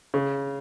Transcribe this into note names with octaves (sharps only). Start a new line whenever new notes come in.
C#3